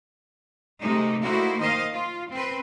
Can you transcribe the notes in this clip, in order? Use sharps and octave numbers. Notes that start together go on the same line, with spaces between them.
C3 G#3 A3 D#4
A3 A#3 D#4 E4 F#4 C5
D#3 C5 D#5 F5
F4
C4 B4